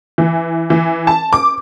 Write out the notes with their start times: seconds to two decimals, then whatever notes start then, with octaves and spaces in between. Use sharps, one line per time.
0.18 E3
0.70 E3
1.07 A5
1.33 D6